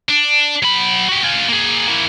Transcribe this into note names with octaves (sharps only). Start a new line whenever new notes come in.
D4
F#3 B5
F#4 G4
F4 G#4
A#3 G#4
A#3 E4